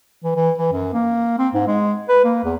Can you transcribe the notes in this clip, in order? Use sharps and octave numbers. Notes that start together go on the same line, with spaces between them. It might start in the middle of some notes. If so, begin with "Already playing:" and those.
E3
E3
E3
F#2
A#3
C4
G#2
G#3
B4
A#3
E2